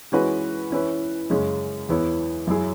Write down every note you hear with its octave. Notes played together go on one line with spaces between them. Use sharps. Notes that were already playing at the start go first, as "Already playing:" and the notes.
E3 G#3 C#4 F#4 B4
E3 C#4 E4 B4
F#2 C#3 G#3 C#4
E2 E3 B3 E4 C#5
F#2 F#3 E4 G#4